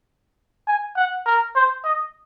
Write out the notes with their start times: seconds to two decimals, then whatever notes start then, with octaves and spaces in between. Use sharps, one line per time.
0.67 G#5
0.96 F#5
1.26 A#4
1.55 C5
1.84 D#5